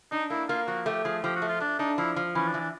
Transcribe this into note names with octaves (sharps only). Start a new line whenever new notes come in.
D4 D#4
A#3 E4
A#3 F4
F3 F#4
A3 G4
F3 G#4
F3 G4
F#4
A3
F4
A3 D4
D4 D#4
F3 E4
F3
E3 C#4
D4
E3
D4